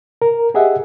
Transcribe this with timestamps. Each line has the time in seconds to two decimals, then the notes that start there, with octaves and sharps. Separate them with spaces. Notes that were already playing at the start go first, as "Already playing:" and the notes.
0.22 A#4
0.54 G4 G#4 D#5 E5 F#5